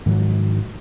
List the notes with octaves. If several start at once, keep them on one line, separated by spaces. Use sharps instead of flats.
G#2 D#3 F3 F#3